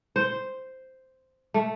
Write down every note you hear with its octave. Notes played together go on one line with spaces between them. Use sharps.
C5
A3